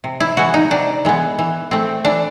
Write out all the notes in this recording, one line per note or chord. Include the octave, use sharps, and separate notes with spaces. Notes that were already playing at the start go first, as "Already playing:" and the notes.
C3
E4
E3 G#3 B3 F#4
D#4
C3 D4
E3 G#3 B3
E3
A3 C4
E3 D4